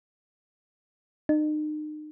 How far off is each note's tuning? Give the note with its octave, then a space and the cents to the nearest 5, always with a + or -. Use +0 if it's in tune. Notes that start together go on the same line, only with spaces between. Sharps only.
D#4 -35